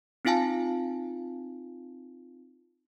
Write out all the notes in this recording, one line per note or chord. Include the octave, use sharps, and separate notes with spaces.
C4 D#4 F4 F5 G#5 A5